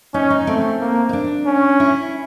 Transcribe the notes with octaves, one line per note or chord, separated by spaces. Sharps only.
C#4 D#4
D#4
A3 C4
A#3
D#4
D4
C#4
E4